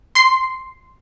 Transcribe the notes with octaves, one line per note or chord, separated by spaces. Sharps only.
C6 C7